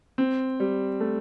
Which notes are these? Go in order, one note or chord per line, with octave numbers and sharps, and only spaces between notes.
C4
G3
A3